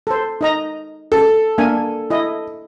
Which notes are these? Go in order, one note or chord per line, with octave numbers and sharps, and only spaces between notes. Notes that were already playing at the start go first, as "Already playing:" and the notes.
A4 C5
D#4 D#5 A#5
A4
A#3 D4 G#5
E4 D#5